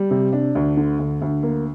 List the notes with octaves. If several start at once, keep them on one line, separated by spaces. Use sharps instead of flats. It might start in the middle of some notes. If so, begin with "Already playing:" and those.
Already playing: G3
C3
D4
D2
D3
D2
D2
A#3